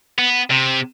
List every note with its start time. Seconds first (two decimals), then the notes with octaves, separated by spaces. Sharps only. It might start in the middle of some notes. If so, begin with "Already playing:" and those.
0.18 B3
0.50 C3